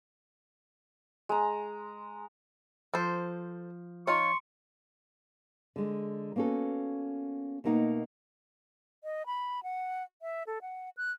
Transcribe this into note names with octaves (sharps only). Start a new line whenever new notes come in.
G#3 A#5
F3 A4 C5
D#4 F4 C#5 C6 C#6
D3 G#3
A#3 B3 C#4 F#4 A4
B2 A3 A#3 D#4 F#5
D#5
B5
F#5
E5
A4
F#5
F#6